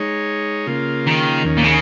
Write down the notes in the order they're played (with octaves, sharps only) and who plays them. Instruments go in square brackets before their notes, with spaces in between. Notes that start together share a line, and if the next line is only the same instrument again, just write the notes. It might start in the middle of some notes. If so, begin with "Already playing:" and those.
Already playing: [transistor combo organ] G#3 D#4 C#5
C#3 A#3 F4
[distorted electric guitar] D#3
[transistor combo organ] D#2 D#3 C#4
[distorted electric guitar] A#2
C#3